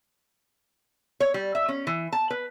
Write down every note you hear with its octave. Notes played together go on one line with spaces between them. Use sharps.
C#5
G3
E5
C#4
E3
A5
B4